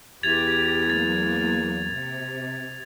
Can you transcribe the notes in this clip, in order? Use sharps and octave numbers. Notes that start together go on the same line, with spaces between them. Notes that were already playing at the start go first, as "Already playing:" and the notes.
E2 G4 G#6 A6 F7
F#3 A#3 A6
C3